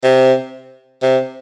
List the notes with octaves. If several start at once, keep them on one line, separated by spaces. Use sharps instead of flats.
C3
C3